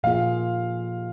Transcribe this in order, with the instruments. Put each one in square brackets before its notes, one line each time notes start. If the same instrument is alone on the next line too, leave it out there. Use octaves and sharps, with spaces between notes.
[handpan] A#2 F3 A#3 F4 G#4 [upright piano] F5